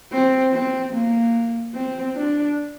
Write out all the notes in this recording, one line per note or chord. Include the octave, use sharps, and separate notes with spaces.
C4
C4
A#3
C4
D4